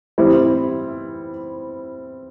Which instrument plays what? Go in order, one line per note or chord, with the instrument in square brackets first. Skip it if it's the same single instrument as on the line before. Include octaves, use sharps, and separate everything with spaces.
[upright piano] E3 G3 C4 E4